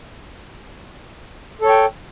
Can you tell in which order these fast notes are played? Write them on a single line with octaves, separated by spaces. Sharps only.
A4 C#5 G5